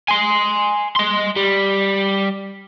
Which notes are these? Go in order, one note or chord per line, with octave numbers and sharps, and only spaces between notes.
G#5 C6
D#5 C6
G3